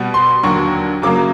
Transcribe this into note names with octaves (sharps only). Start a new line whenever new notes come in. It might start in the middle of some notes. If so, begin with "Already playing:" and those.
Already playing: B2 G3 B3
C6
D#2 D3 F#3 C#6
F#2 C#3 F#3 A#3 D6